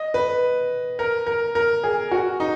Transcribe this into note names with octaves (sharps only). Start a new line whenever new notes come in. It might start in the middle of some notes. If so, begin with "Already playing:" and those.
Already playing: D#5
B4
A#4
A#4
A#4
G#4
F#4
D#4